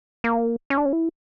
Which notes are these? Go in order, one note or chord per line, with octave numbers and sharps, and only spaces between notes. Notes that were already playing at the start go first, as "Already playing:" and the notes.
A#3
C#4
D4
C#4
E4